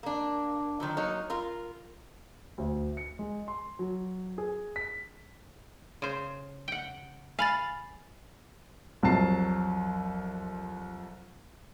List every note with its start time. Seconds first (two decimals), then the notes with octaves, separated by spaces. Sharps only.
0.03 A#3 D4
0.80 D#3 F3 F#3
0.97 F#3 A#3 D#4 C#5
1.30 F4 A#4
2.58 D2
2.97 C#7
3.19 G#3
3.48 C6
3.79 F#3
4.38 G#4
4.76 B6
6.02 C#3 C5
6.68 F#5 G5
7.39 F5 G#5 B5 A6
9.03 C2 F2 F#3 A5 C7